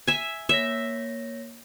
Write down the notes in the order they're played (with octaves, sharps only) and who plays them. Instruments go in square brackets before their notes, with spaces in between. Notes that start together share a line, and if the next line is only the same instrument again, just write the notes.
[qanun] E5 G#5
[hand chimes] A#3 C#5 A#6 [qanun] E5